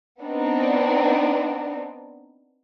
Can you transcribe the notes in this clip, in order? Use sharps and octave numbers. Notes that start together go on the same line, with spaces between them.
B3 C4 D4 D#4